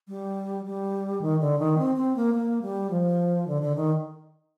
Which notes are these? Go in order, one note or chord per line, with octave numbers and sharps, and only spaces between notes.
G3
G3
D#3
D3
D#3
C4
C4
A#3
A#3
G3
F3
D3
D3
D#3